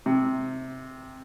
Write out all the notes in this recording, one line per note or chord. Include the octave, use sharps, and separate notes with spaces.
C3